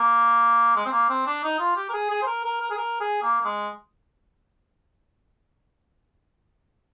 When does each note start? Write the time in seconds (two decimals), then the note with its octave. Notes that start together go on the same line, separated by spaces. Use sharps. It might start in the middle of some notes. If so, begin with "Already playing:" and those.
Already playing: A#3
0.76 G#3
0.86 C4
0.92 A#3
1.09 C4
1.26 D4
1.43 D#4
1.60 F4
1.76 G4
1.89 A#4
1.93 G#4
2.10 G#4
2.22 C5
2.27 A#4
2.44 A#4
2.61 A#4
2.71 G#4
2.77 A#4
3.01 G#4
3.23 A#3
3.40 A#3
3.45 G#3